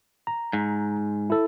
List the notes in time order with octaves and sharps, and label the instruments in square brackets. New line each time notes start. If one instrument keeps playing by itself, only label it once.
[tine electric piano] A#5
[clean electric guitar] G#2
[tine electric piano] E4 A4